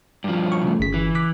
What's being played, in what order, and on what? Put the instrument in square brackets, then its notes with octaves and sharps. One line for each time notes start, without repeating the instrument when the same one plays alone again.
[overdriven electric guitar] G2 F3 [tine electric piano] D5
[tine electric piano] C#5 C#6
C#3 A3
G1 C#3 B6
[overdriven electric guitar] E3
[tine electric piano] D6 F#6 B6